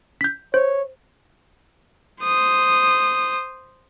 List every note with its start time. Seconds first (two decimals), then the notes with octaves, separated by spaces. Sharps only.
0.21 G6 B6
0.54 C5 C#5
2.24 C5 D#6